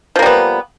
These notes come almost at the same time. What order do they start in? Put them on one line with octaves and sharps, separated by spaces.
F3 A#3 G3 B3